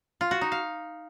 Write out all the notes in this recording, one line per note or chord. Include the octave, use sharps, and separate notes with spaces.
F4
F#4
D#4
F5